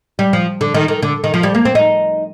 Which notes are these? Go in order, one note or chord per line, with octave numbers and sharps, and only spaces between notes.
G3
F3
D3
D#3
D#3
D3
D#3
F3
G3
A#3
C4
D#4